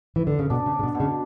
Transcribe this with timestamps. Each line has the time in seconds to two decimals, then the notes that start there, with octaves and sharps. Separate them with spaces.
0.16 E3
0.27 D3
0.39 C#3
0.50 B2 D4
0.66 C#3
0.73 D4
0.79 C#3
0.83 B2
0.95 B2
1.00 C#3